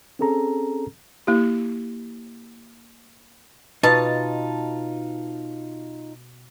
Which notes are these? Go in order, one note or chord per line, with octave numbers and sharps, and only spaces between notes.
C4 C#4 G#4 A4 A#5
A#3 E4 G4
B2 D#4 F4 A5